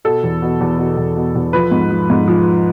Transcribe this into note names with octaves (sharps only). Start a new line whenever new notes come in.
B2 A4
E2
B2
E2
B2
E2
B2
E2
F3 B4
G#2
F3
G#2
F3